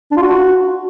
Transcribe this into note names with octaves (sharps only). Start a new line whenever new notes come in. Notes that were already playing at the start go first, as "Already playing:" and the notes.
D4
F4
F#4